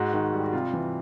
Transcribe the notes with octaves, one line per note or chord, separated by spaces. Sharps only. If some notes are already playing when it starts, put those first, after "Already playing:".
Already playing: G#2 F#4
D#3
G3
F#4
C3 F4
E3